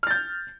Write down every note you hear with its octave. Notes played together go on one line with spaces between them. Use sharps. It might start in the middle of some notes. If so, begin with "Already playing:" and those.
F6 G6 A6